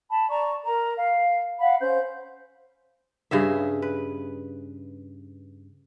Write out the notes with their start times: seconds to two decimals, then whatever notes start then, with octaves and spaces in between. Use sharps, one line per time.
0.10 A5 B5
0.29 D5 A#5 C#6
0.63 A#4 A#5
0.96 F5
1.60 F5 F#5 B5
1.79 C#4 C5 G6
3.31 G2 C#3 G#4 E5
3.82 B4